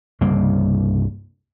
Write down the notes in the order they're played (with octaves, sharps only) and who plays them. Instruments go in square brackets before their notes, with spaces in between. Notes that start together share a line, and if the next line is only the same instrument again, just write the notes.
[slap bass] C2 G2 C#3 A#3